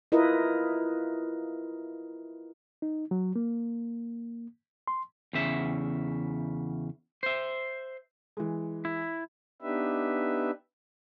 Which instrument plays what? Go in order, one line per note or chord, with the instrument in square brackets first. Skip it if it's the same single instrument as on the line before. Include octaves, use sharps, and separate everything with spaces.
[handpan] E4 F4 A#4 B4 D#5
[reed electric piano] D#4
F#3
A#3
C6
[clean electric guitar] E2 C#3 E5
C5 E5
[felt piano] E3 G#3
[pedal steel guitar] E4
[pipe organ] B3 D4 D#4 G4 B4 E5